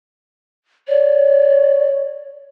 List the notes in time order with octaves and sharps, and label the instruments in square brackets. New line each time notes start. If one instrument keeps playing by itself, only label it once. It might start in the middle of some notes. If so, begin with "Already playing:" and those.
[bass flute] C#5 [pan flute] D5